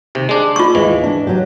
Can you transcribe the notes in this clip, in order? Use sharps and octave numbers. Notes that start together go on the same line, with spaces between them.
D#2 C3
G#3 D4
F4 C#6
D#2 E3 G#3
D4
F#3 G4